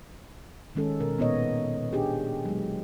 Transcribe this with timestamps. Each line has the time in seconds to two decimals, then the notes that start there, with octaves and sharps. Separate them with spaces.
0.75 D#3 G#3 C#4 A4
1.00 B2 A#4
1.18 A#2 B3 D#4 C#5 D#5
1.93 D4 G4 G#4
2.45 F#3 G#3